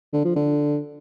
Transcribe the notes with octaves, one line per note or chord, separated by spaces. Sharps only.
D3
F3
D3